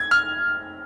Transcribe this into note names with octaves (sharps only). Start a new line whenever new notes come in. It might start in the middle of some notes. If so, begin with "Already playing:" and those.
Already playing: G#6
F6